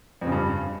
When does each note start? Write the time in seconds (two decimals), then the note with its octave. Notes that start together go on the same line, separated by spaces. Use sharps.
0.21 F2
0.27 C#3
0.32 G2